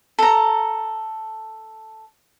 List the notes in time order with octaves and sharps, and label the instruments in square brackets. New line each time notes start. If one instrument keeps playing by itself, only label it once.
[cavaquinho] A4 A#5